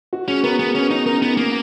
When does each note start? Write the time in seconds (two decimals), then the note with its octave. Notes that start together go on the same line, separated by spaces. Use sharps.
0.13 F#4
0.28 C#4 G#4
0.44 B3 A#4
0.59 B3 G#4
0.75 B3 C#4
0.90 C#4 D#4
1.06 D#4 A#4
1.22 B3
1.37 A#3